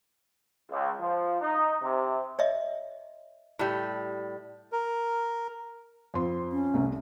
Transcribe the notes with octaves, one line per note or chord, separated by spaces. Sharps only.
C#2
F3
D#4
C3
C#5 D#5 E5
A2 G3
A#4
F2 C4 C6
C#4
C2 A3 E5